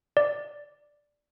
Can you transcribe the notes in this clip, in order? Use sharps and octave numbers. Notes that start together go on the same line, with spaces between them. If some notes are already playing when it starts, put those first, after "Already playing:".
D5